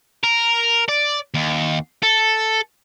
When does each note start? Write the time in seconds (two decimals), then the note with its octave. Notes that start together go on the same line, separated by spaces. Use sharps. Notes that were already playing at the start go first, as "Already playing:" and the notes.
0.24 A#4
0.89 D5
1.34 D#2
2.03 A4